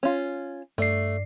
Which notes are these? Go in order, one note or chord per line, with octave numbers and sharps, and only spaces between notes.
C#4 F4
G2 A3 D5 C7